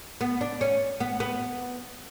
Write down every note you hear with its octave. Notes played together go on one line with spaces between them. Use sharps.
B3
D4
C#4
B3
B3